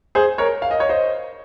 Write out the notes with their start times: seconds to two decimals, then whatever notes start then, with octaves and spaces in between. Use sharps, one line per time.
0.15 G#4 C5
0.38 A#4 C#5
0.62 F5
0.71 D#5
0.80 C#5
0.89 C5 D#5